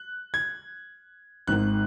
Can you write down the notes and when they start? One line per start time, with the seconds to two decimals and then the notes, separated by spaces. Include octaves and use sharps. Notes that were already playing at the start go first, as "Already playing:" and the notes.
Already playing: F#6
0.34 G#6
1.47 G#1 G#2 D#3 F#6